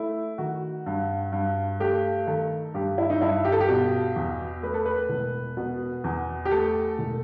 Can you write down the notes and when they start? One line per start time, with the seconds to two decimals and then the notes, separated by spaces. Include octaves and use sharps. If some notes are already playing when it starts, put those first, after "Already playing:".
Already playing: A3 E4
0.38 D#3 F#4
0.86 G2
1.32 G2
1.80 A3 G4
2.27 D#3 A4
2.74 G2 G4
2.98 E4
3.10 D#4
3.21 G2 E4
3.45 G4
3.52 A4
3.60 G4
3.68 B2
4.16 E2
4.63 A3 B4
4.74 A4
4.85 B4
5.09 E1
5.57 B2
6.04 E2
6.45 G4
6.51 A3 A4
6.99 E1